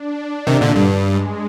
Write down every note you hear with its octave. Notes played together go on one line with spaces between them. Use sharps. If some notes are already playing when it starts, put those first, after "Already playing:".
Already playing: D4
C3 D#3
A#2 D3
G2
G#3